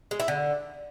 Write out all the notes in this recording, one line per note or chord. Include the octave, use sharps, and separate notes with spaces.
G#3
E4
D3